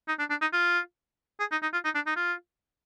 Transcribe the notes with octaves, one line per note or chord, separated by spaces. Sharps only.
D#4
D4
D4
D#4
F4
G#4
D#4
D#4
F4
D#4
D4
D#4
F4